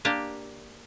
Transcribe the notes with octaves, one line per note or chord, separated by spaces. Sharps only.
A#3 D4 G4